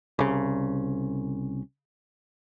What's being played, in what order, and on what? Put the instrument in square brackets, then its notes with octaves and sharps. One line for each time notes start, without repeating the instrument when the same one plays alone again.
[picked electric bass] C2 C#3